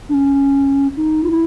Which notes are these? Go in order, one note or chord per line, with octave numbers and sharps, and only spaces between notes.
D4
C#4
D#4
F4
E4